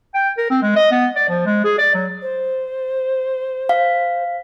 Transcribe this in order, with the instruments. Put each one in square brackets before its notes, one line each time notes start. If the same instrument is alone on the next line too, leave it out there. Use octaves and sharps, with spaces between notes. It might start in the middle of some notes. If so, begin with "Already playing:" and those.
[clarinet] G5
A#4
C4
G#3
D#5
B3
D5
F3
G#3
G#4
D5
F#3
[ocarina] C5
[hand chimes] F5